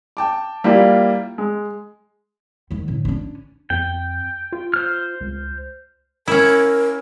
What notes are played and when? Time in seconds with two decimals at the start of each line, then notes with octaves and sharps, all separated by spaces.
0.17 G5 A5 D6
0.64 G3 A#3 E4 F4 G4
1.38 G#3
2.71 D#2 D#3
2.88 A2 D3
3.05 C#4 D4
3.70 F2 G5
4.52 F4
4.74 C5 F6
5.21 C#2
6.28 C#4 E4 A#4